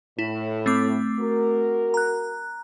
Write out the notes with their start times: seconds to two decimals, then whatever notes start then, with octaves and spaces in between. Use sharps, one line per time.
0.19 A2 E4
0.66 A3 C4 D6
1.20 F#4 A#4
1.94 A#5 F#6